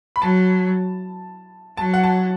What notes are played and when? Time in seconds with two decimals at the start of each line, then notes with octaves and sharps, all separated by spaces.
0.16 B5
0.21 F#3 A5
1.77 F#3 A5
1.94 F#5
2.03 A5